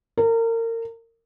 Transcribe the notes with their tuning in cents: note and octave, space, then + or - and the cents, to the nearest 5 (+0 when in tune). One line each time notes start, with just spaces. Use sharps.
A#4 -30